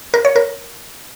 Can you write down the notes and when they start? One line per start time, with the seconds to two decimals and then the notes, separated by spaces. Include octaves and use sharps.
0.14 A#4
0.25 C#5
0.36 A#4